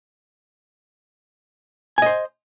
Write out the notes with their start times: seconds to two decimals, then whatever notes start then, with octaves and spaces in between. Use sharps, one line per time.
1.98 G#5
2.02 D#5
2.06 C5